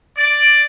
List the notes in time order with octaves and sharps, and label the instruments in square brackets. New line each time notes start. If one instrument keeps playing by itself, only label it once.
[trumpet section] D5